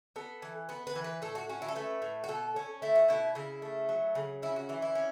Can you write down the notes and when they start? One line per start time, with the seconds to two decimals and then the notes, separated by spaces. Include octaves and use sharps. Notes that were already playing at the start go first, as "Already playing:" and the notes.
0.16 B3 A4
0.42 E3
0.69 B3 B4
0.87 B4
0.96 E3
1.04 B4
1.22 A2 A4
1.35 F#4
1.49 C#4 F#4
1.62 E4
1.68 A4
1.76 A3 B4
2.02 A2
2.24 F#4
2.28 B2 A4
2.56 C#4
2.82 A3 E4
2.95 F#4
3.08 B2 E4
3.35 C#3 E4
3.62 A3
3.89 F#3
4.15 C#3
4.42 C#4 E4
4.56 F#4
4.69 E3 E4
4.82 E4
4.95 C#4